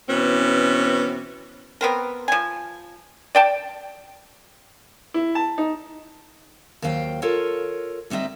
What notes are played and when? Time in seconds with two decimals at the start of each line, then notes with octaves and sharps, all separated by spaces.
0.08 B2 E3 C4 C#4
1.81 B3 C4 A#4
2.28 F3 G#5
3.35 D5 G5 A5
5.14 E4
5.35 A5
5.58 D#4
6.82 D#2 F#3 C5 F5 G5
7.22 F4 A4 A#4 C#5
8.10 D2 G3 C4 D#4 E5